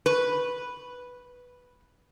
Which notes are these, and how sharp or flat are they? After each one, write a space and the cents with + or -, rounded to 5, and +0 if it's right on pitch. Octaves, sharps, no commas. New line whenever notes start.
B4 -5